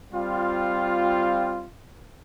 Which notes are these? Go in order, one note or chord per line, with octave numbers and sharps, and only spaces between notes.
G3 C4 F4